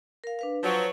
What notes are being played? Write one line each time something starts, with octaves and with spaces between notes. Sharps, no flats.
A#4 F5
D4 B4 F5
F3 F#3 B4